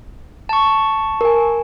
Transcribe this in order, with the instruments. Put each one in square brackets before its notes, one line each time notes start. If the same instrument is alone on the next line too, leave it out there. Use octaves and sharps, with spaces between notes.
[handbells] A5 C#6
[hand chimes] A#4 G#5